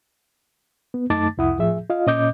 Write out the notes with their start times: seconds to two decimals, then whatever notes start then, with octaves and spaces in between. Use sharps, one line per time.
0.94 B3
1.10 F#2 A3 D#4 A5 D6 A6
1.38 C2 F2 E4 F#5 D#6
1.58 A2 F3 G#4 E5
1.90 F4 D#5 F5
2.07 A#2 C#4 D#5 D6 G6